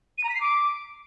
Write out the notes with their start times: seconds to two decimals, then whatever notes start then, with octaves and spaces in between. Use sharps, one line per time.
0.18 D#7
0.24 A#5
0.29 B6
0.35 C7
0.41 D6